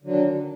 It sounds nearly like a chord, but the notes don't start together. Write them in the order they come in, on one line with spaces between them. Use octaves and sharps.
D3 F#3 D#3 D4